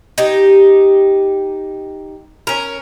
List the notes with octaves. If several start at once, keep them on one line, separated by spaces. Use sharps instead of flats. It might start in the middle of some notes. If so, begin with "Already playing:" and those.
D#4 G4
C#4 A#4